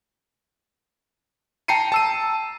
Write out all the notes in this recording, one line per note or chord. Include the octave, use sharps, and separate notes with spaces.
G5 A5 A#5 C7 C#7 D#7
A5 E6 D#7